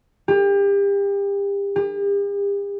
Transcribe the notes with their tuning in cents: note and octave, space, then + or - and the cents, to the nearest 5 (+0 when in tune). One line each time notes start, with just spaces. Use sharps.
G4 +35
G4 +45